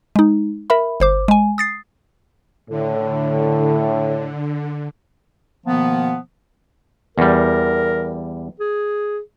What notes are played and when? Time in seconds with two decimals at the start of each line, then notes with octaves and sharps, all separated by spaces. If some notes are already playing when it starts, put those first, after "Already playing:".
0.16 G#3 D#4
0.70 A#4 E5 B5
1.00 G1 C5 D6
1.28 G#3 G#5
1.58 D#6 A6 C7
2.69 A2 D3
5.66 B2 D#3 F3 A#3 B3
7.18 E2 G3 A#4
8.60 G#4